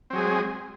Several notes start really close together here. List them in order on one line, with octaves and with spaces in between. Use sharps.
C4 F#3 G#4 G#3